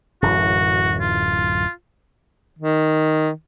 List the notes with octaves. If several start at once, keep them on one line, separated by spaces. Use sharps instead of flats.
D1 F#2 E3 F#4
F4
D#3